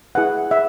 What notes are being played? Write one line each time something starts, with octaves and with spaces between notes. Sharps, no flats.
E4 G#4 B4 F#5
E5